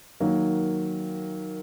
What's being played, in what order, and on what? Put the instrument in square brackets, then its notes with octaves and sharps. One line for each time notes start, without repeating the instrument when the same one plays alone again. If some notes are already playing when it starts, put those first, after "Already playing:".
[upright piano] D#3 F#3 A#3